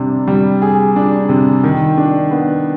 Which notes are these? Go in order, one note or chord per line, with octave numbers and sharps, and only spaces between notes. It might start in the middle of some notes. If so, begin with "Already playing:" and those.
Already playing: C3 G3 D4
G3
G#4
D4
C3
D#3
D4
B3